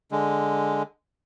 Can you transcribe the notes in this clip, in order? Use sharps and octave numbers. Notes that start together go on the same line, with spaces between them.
D3 G#3